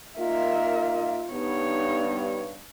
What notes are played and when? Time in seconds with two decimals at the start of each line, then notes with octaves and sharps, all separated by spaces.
0.18 A#3 D#4 F4 A#4 E5
1.30 G2 B3 D#4 C#5